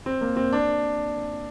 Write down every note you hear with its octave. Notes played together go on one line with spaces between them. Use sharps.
C4
A#3
C4
D4